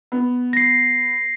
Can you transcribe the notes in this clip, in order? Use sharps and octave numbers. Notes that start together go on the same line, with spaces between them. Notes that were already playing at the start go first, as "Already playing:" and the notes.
B3
A#6 C7